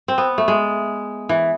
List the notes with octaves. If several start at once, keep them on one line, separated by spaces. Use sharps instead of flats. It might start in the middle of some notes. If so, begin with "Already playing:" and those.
C4
B3
A3
G#3
E3